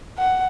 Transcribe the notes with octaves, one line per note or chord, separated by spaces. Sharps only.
F#5